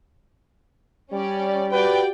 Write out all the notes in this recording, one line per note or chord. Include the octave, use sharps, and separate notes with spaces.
G3 C#4 D5
F#4 G4 B4 D5 F#5 G5